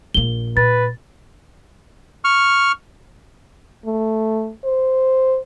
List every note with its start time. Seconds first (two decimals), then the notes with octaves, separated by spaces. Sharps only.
0.14 A#1 A#3 G7
0.57 A#2 B4 A6
2.24 C#6 F6
3.86 A3
4.65 C5